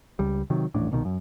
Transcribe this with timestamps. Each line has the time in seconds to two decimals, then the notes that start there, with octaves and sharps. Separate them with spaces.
0.19 C#2 G3
0.50 C3 D#3 F#3
0.74 D#1 A1 A2 D4
0.92 C2 B2 D#3
1.05 F#2